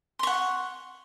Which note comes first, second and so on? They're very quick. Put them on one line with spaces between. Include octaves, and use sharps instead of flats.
C6 C#6 F#5